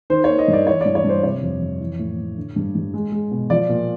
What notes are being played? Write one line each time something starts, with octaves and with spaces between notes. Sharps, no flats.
D#3 C5
C#5
A#3
D#5
G2
D5
E3 C#5
G2 D5
C#5
G2 C5
C3 C#5
F2
F2
E3
A2
A2
D3
G2
G2
G#3
G#3
B2
F3 D5
A#2